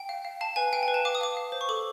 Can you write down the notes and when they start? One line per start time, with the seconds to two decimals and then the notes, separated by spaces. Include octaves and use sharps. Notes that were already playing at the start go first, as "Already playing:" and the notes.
Already playing: G5
0.09 F5
0.25 F5
0.41 F5 A5
0.56 B4 G#5
0.73 F5 G5
0.83 G#5
0.88 B4
0.94 A5
1.05 F5 D6
1.15 D#6
1.21 F5 D6
1.37 F5
1.52 C5
1.61 C#6
1.69 A4 D6